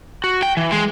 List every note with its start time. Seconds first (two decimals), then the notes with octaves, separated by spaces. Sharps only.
0.24 F#4
0.43 G5
0.57 E3
0.72 G#3